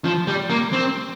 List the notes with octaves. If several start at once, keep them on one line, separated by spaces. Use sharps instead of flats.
F3
G3
A#3
C4